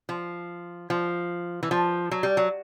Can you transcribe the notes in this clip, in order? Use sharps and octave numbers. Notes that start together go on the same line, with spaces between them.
F3
F3
E3
F3
F#3
G3
F#3